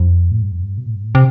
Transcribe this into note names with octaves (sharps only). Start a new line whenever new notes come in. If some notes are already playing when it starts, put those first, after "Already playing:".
Already playing: F2
A2
G2
F2
G2
B2
A2
G2
A2
C3